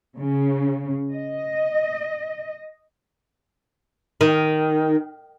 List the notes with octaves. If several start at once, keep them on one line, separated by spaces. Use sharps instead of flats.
C#3
D#5
D#3